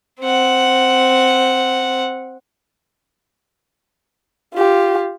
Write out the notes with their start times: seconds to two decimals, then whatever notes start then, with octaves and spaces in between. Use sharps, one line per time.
0.20 C4 F#5
4.54 F4 G4